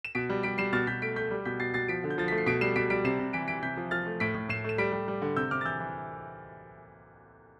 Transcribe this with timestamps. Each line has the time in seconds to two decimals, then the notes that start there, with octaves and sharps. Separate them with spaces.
0.05 E7
0.15 B2 B6 D7
0.30 G3
0.43 G3 B6 D7
0.58 G3 C7 E7
0.73 B2 F6 A6
0.87 B2 G6 B6
1.02 A3 B6 D7
1.16 A3 G6 B6
1.31 G3
1.45 B2 G6 B6
1.59 B2 A6 C7
1.74 B2 A6 C7
1.88 F3 B6 D7
2.04 D3
2.10 G6
2.18 F3 A6
2.28 A3 B6
2.38 C7
2.46 B2 B6 D7
2.61 G3 C7 E7
2.76 B2 B6 D7
2.90 G3 B6 D7
3.04 C3 C7 E7
3.19 C3
3.33 E3 B6 D7
3.48 E3 B6 D7
3.63 C3 G6 B6
3.77 F3
3.91 F3 F6 A6
4.06 A3
4.20 A2 B6 D7
4.35 A2
4.49 A2 C7 E7
4.64 A3 E7
4.78 G3 B6 D7
4.92 G3
5.08 G3
5.22 D3
5.36 C3 E6 G6
5.51 C3 D6 F6
5.61 A6
5.65 E3 E6 G6
5.80 E3